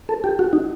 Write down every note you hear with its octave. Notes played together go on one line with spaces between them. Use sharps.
A4
G4
F#4
D#4